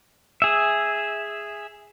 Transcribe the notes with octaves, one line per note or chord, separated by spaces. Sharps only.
G#4 E5